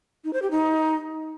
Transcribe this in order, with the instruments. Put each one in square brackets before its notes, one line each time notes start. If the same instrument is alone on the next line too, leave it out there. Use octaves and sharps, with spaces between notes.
[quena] D#4
C5
G4
D#4